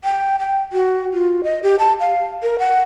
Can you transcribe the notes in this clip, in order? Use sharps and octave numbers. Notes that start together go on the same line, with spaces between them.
G5
G5
F#4
F4
D#5
G4
A5
F5
A#4
F#5